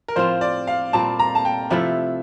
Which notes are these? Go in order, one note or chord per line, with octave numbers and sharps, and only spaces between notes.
A#4
A2 F3 C4 F4 C5
D5
F5
A#2 G3 C4 A5
A#5
A5
G5
C3 F3 A3 E4 E5